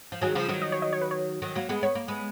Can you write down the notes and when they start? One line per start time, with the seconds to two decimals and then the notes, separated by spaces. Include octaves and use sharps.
0.12 F3
0.22 D#3 F#3 G#4
0.35 C#3 F3
0.49 D#3 F#3
0.62 D#5
0.72 C#5
0.82 D#5
0.93 C#5
1.01 B4
1.11 C#5
1.42 D#3 F#3
1.55 F#3 A#3
1.69 G#3 B3
1.83 B3 C#5
1.95 A#3
2.08 G#3 B3